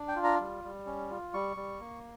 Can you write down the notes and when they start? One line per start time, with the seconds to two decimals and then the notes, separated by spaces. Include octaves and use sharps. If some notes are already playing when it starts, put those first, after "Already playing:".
Already playing: D4
0.08 G5
0.16 F4
0.24 A#5
0.40 G3
0.64 G3
0.86 C#4
1.11 F4
1.34 G3 C#6
1.57 G3
1.80 A#3